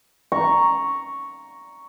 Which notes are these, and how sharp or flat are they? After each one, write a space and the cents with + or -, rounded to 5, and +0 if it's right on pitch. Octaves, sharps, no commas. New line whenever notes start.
A#5 +0 C#6 +0